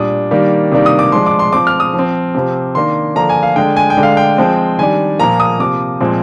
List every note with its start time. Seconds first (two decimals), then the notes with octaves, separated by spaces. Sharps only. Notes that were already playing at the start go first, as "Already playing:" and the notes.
Already playing: A#2 G3 D4 D#6
0.31 D#3 G3 A#3 D4
0.71 C3 D#3 G3 A#3 D4
0.86 D#6
0.99 D6
1.12 F3 G#3 D4 C6
1.26 D6
1.39 C6
1.53 F3 C4 D6
1.67 F6
1.80 D#6
1.94 F3
1.99 C4
2.35 C3 F3 C4
2.75 D#3 A#3 D4 C6
3.15 D3 F3 A#3 D4 A#5
3.30 G#5
3.43 F5
3.56 D3 G#3 D4 G5
3.77 G#5
3.90 G5
3.97 D3 G#3 D4
4.03 F5
4.17 G5
4.38 F3 G#3 C4
4.78 D#3 G3 D4 G#5
5.19 A#2 F3 A#3 A#5
5.40 D#6
5.59 C3 F3 A#3 D6
6.00 A#2 F3 G#3 C4